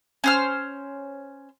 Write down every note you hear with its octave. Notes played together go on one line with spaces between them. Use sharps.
C#4 C5 F6